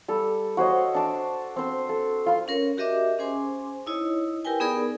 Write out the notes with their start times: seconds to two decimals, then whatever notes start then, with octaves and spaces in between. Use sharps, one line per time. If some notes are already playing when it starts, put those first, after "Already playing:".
0.08 G3 A4
0.57 F#4 C5 C#5 D#5
0.95 D4 A5 D6
1.56 C4 C5
1.89 A4
2.26 F4 C6
2.48 C#4 A#4 C#5
2.78 F#4 G4 A#4 D#5 E5 D6
3.19 C#4 G#4 C5 G#5 C6 D6
3.87 D#4 E4 C#5 D#5
4.45 E4 G4 A#4 B4 G5 G#5
4.60 B3 D#4 G#4 A#4 D5